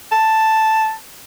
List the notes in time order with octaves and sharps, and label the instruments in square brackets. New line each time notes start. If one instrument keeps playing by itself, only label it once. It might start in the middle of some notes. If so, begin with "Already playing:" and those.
[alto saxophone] A5